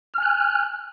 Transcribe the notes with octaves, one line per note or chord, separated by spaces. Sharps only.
G#5 F6 F#6